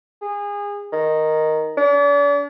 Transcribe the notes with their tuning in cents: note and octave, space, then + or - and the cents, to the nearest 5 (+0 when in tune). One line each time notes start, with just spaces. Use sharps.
G#4 -30
D#3 +0
D4 -40